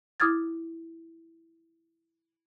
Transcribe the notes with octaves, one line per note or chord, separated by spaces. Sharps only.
E4 D6 D#6 F6 G#6 A6